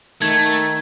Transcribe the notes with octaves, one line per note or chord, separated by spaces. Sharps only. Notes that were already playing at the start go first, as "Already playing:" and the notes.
D#3 A3 G#6